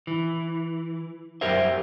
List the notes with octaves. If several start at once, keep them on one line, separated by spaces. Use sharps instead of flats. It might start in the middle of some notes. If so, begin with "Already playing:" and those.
E3
F#2 G4 A#4 C5 E5